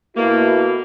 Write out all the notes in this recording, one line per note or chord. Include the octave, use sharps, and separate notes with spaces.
B2 A3 A#3 E4 F#4